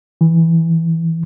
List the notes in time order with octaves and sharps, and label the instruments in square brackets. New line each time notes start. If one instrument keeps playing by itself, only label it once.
[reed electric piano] E3